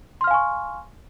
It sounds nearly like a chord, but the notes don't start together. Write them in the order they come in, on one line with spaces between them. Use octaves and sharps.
C6 F6 F5 G#5 C#6